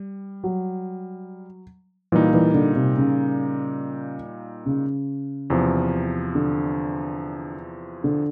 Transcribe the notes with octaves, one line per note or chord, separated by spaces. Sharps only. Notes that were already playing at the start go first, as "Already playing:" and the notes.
Already playing: G3
F#3
A#2 E3 G3 A#3 D#4
E3
D3
C3
C#3
C#3
E2 C3 F3
D3
D3